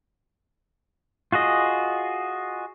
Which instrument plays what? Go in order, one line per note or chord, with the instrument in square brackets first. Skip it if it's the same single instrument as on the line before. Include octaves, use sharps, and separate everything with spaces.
[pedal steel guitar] F4 F#4 G#4 D#5